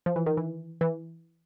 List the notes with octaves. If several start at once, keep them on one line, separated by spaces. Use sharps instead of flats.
F3
E3
D#3
E3
E3